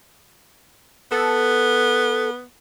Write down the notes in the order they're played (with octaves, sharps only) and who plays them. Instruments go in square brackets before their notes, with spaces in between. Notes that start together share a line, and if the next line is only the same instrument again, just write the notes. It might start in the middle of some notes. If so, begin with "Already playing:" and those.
[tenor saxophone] B3 [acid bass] A4